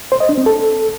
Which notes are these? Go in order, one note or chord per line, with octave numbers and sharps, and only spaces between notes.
C5
D#5
D4
C4
A4